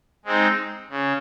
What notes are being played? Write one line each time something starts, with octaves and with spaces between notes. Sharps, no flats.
G#3 C4 D#4
C#3